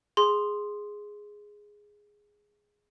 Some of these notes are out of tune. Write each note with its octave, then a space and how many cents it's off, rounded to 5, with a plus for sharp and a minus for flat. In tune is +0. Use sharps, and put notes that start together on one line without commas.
G#4 +0 C6 +0